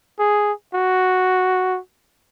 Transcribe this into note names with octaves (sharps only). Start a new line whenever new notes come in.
G#4
F#4